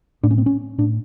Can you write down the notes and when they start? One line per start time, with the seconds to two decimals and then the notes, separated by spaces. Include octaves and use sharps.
0.23 A2 D4
0.31 C#4
0.38 C4
0.46 C#4
0.78 A2 D4